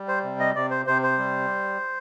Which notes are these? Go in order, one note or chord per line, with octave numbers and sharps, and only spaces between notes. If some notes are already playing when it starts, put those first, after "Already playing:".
Already playing: G3
C5
C3
D#5
C3 D5
C5
C3 C5
C5
G3